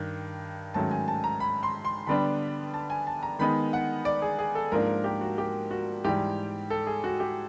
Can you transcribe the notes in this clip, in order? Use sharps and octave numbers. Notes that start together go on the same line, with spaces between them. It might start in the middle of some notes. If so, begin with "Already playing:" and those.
Already playing: G2 D#3
G#2 D#3 F#3 A3 C#4 A5
G#5
A5
A#5
B5
C6
C6
D3 G3 B3 D4 B5
A5
G#5
A5
A#5
D#3 G#3 B3 D#4 B5
F#5
D5
G#4
G#4
A4
G#2 F3 A#3 D4 A#4
G4
F#4
G4
F#4
G#2 E3 G3 G4
A4
G#4
F#4
G4